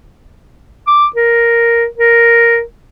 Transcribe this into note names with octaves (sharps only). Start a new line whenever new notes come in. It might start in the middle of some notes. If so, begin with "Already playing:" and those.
D6
A#4
A#4